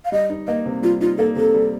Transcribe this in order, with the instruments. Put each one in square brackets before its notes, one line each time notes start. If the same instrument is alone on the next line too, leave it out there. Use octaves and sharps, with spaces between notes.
[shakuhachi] F5
[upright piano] G3 [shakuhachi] D#5
[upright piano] D#4
[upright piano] A#3 [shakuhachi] D#5
[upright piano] C3
[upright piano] G3 [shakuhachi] F4
[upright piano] D#4 [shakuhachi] F4
[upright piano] A#3 [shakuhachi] A4
[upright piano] C3 [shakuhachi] A4
[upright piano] G3